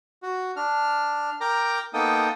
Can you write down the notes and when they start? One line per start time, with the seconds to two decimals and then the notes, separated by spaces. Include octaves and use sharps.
0.23 F#4
0.56 D4 F6
1.41 A#4 G5 A#5 D6
1.94 A#3 B3 D#4 A4 G5 D#6